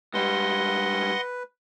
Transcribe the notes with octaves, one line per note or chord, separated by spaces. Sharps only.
G#2 G3 B4 D#5 F#5 C6